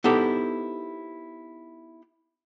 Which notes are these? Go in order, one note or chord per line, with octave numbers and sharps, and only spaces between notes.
B3 D#4 E4 G4 A4 C5